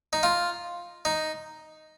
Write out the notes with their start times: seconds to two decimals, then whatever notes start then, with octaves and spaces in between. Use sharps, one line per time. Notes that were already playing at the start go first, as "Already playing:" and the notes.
0.13 D#4
0.23 F4
1.05 D#4